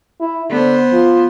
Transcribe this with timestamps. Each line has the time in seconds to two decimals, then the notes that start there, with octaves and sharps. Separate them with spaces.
0.20 E4
0.50 D3 B3 C5
0.92 F3